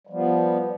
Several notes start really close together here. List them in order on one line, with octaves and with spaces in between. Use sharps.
G3 F3 B3